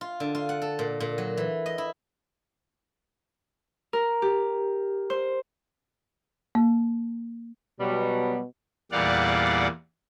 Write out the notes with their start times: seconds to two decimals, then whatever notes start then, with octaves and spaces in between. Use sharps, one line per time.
0.01 F4
0.20 D3
0.35 F4
0.49 F#5
0.62 A4
0.79 A#2
1.00 A#2
1.18 F#3
1.37 E3
1.66 D#5
1.78 E4
3.93 A#4
4.22 G4
5.10 C5
6.55 A#3
7.80 B2 F#3 G3
8.92 E2 A#2 G3 D5 F5 F#5